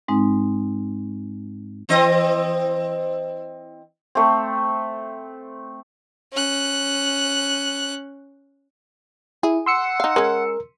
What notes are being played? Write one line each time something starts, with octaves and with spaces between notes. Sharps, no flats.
G#2 G#3 C4 D#4
E3 C4 D#5
A3 C4
C#4 F#6
E4 G#4
F#5 C6 E6 C#7
D#4 F5
G#3 C#4 A#4